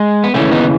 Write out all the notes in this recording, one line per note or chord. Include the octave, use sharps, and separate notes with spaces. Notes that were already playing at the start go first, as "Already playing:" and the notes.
Already playing: G#3
B3
D#2 C#3 E3 A3 C#4
B3 D#4